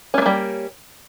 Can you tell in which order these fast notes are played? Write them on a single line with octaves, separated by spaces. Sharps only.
C#4 A3 A#3 G3